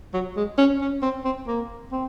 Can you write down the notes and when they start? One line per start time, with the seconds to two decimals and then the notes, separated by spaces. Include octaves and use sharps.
0.14 F#3
0.37 G#3
0.58 C#4
0.81 C#4
1.03 C4
1.25 C4
1.47 A#3
1.92 C4